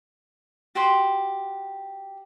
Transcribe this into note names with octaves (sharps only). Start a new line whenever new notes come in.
F#4 G4 B5 C6